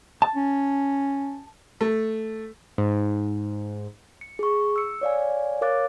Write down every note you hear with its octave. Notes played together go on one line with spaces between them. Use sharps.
A5
C#4
A3
G#2
C#7
G#4 C#6
E6 C#7
C#5 D5 F5 G#5
A#4 C#5 F5 D6 F#6 A6